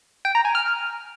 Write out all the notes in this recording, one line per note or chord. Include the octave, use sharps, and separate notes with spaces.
G5
A#5
G#5
F6